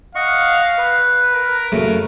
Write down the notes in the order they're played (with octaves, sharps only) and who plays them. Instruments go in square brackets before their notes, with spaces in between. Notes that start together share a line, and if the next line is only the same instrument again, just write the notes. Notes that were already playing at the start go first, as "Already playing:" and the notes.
[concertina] D#5 F#5 C#6 [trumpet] F5
[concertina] B4
[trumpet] A#4
[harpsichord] F#2 C#3 A3